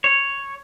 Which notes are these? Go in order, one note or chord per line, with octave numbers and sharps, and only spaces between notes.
C#5